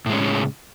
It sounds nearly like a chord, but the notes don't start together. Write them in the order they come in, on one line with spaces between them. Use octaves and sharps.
A2 G#3 C#4 C#3